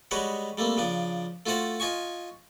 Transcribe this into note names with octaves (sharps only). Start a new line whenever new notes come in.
G3 G#3 F#4 B4 C#5 D#5
G3 A3 A#3 C4
C#3 F3 D4
A3 F4 F#4 C5 F#5 A5
F4 D#5 G#5 C#6